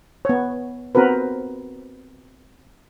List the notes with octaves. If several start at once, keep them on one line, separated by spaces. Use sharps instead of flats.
B3 C#5
B3 C4 F#4 A#4 B4